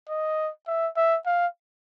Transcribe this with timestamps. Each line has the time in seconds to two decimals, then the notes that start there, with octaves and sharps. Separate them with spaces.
0.09 D#5
0.67 E5
0.97 E5
1.26 F5